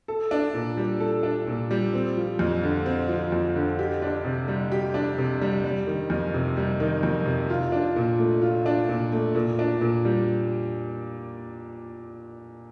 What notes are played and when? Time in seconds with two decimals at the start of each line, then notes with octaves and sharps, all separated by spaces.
0.08 A4
0.31 D4
0.54 A#2
0.77 G3
1.00 A4
1.23 D4
1.47 A#2
1.71 G3
1.93 C4
2.17 F3
2.39 F2
2.63 D3
2.86 C4
3.09 F3
3.32 F2
3.56 D3
3.79 G4
4.02 D4
4.25 C3
4.48 G3
4.72 G4
4.94 D4
5.18 C3
5.41 G3
5.64 G3
5.87 D#3
6.10 F2
6.34 C3
6.57 G3
6.80 D#3
7.03 F2
7.26 C3
7.50 F4
7.72 D4
7.96 A#2
8.19 A3
8.42 F4
8.66 D4
8.89 A#2
9.12 A3
9.35 A#2
9.59 D4
9.81 A#2
10.05 G3